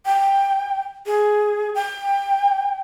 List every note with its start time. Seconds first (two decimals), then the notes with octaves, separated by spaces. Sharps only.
0.06 G5
1.06 G#4
1.75 G5